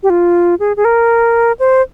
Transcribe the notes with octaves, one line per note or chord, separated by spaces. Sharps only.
G4
F4
G#4
G#4
A#4
C5